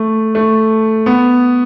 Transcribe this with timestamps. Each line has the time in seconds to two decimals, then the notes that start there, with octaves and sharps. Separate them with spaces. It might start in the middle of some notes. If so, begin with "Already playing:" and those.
Already playing: A3
0.35 A3
1.06 B3